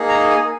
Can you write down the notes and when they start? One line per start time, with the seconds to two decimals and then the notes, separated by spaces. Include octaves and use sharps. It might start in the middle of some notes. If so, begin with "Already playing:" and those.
Already playing: A#3 D#4 G#4
0.09 A#5
0.30 G#5